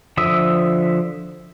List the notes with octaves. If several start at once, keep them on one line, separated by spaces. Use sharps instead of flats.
D3 F3 E5 D#6